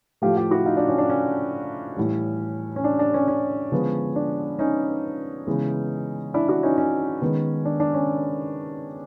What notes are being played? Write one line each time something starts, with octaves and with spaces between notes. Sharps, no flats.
A2 F3 A3 F4 G4
F4 G4
E4 F#4
D#4 F4
D4
C#4
D4
C#4
A2 E3 G3
C#4
D4
D4
C#4
C#4
D3 F3 G#3 B3
D4
C#4 D#4
C#3 E3 G#3 B3
D4 E4
E4 F#4
C#4 D#4
C#4
D#3 G#3 B3
D4
D4
C#4